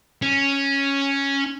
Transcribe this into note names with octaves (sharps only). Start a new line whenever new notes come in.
C#4